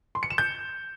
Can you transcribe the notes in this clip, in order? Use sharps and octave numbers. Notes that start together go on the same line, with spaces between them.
C6
C#7
E7
G6